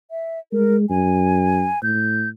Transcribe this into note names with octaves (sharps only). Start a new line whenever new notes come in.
E5
G#3 A#4
F#2 G#5
A2 G6